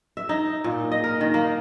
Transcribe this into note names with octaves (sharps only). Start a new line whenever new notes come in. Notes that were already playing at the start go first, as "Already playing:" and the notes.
E5
D#4
A#2
D#5
A#4
D#3
A#3